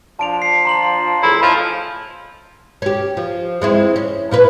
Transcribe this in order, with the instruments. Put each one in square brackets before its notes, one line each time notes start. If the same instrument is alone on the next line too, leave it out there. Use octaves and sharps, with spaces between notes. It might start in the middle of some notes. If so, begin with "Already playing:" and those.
[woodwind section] F3 D4 F4 [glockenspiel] A5 D7 F7
[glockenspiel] C7
A#5 C6 F#7
[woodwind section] E2 A2 [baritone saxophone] E4
[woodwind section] A2 C#4 D#5 [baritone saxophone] F3
[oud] C#4 G4
F3
G#3 C4 E4
C#4
A#2 E4 B4